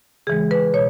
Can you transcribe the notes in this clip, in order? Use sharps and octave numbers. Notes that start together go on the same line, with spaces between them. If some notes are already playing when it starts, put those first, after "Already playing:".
C#3 E3 G#3 G#4
B4
B2 C#5